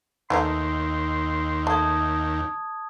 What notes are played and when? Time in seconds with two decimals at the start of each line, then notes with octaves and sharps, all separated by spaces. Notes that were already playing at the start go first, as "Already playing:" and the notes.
0.30 D#2 E3 A3 D#4 C6
1.67 A3 A5 D#6 G#6